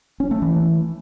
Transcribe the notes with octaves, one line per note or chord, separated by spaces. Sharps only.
C#4
A3
E3